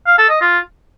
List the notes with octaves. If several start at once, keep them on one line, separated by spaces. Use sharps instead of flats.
F5
A4
D#5
F4